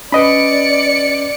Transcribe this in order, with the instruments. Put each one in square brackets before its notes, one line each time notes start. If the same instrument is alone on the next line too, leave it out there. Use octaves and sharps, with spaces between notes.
[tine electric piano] C#4 [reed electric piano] B4 D#5 B5 [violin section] D5 C#7